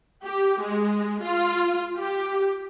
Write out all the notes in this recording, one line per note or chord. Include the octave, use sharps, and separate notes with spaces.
G4
G#3
F4
G4